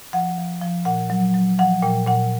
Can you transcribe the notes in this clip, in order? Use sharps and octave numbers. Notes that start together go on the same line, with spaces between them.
F3 F#5
F3
F3
A#2 F#5
F#3
F#3
F3 F#5
A#2 G5
A#2 F#5